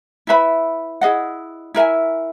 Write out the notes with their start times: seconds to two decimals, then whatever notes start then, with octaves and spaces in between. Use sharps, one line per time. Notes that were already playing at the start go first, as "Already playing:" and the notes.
0.27 E4 B4 E5 B5
1.01 E4 G#4 D#5 F#5
1.74 E4 A#4 E5 G#5